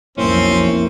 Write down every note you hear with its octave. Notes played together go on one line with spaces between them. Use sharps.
B1 F2 A#3 C4 C#4 E4